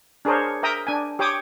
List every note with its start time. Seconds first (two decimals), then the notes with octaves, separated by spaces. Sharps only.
0.25 D4 G#4 A#4 C5 C#5
0.63 A#4 E5 G5 A#5 D#6
0.87 D4 G#5
1.19 G4 C#5 G5 D6 D#6